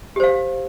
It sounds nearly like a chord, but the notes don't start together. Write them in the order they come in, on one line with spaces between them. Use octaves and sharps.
G4 C5 F5